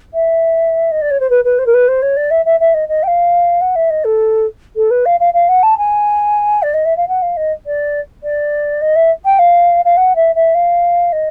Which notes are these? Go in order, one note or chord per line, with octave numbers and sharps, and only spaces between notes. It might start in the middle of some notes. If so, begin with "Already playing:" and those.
E5
D#5
D5
C#5
C5
B4
B4
C5
A#4
B4
C5
C#5
D5
E5
E5
E5
D#5
D#5
G5
F5
F#5
E5
D#5
A4
A4
B4
F5
F5
F5
F#5
A5
G#5
D5
D#5
E5
F5
F#5
F5
D#5
D5
D5
D#5
E5
G5
F5
F5
F#5
E5
E5
F5
D#5